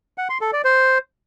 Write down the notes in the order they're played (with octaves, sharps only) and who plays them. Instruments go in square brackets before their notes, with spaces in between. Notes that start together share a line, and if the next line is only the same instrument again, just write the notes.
[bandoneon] F#5
C6
A4
D5
C5